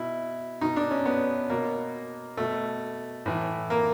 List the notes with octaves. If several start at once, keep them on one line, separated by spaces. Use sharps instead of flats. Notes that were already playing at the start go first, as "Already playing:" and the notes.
Already playing: B2 E4
B2 D#4
D4
C#4
B3
B2 A#3
B2 A3
A2 E3
A#3